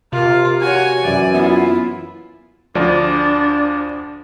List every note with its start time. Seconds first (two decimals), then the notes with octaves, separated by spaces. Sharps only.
0.13 C3 F4 A#4
0.61 F#4 C#5 G#5
1.03 F#2 E3 D5
1.35 B3 E4 F4
2.75 D2 F3 D4 D5